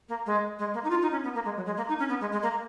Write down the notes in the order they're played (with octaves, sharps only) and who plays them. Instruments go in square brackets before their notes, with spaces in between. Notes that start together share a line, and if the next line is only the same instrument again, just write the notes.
[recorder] A#3
G#3
G#3
A#3
D#4
F4
D#4
C#4
B3
A#3
G#3
F#3
G#3
A#3
D#4
C#4
B3
G#3
G#3
A#3